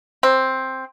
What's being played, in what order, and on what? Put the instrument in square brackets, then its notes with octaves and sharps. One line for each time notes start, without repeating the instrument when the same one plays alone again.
[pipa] C4